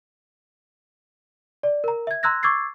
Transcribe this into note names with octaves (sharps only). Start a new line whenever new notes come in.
D5
A#4 A#5
E5 G#6
A#5 C6 E6 F#6 G#6 A#6
C#6 D6 E6 G#6 A6 C7